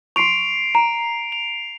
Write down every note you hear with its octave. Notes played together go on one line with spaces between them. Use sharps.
C6 C#6 C7 D7 F7
A#5 D7
F7